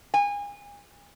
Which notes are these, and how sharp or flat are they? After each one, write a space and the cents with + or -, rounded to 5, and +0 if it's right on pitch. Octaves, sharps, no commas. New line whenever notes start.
G#5 -30